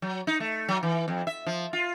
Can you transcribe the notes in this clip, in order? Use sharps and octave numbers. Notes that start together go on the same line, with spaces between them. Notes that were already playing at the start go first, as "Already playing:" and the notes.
F#3
D#4
A3
F#3
E3
F2
E5
F3
F4